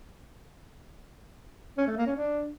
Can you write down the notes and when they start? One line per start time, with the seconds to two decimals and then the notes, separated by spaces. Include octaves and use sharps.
1.77 C#4
1.87 A3
1.97 A#3
2.06 C#4
2.16 D4